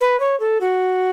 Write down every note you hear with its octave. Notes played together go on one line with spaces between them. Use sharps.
B4
C#5
A4
F#4